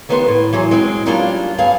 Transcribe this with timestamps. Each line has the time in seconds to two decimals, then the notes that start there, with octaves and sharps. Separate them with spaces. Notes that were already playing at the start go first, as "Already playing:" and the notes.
0.09 D#3 A3 B3 G4 C5
0.28 A2
0.53 E3 F#3 G#4 C5
0.71 G#3 C4 F#4 G#4
1.06 F#3 G3 A#3 C#4 D4 F4
1.58 D2 G2 B3 G#4 F5